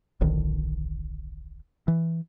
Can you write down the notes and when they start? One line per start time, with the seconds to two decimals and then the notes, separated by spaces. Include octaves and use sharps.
0.21 D1 A#1 D3 D#3
1.88 E3